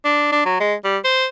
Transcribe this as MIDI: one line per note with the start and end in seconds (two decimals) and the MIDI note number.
0.05 0.28 62
0.32 0.44 62
0.45 0.59 54
0.60 0.75 56
0.84 0.97 55
1.04 1.26 72